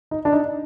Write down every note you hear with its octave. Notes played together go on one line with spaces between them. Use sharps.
D#4
D4
D#4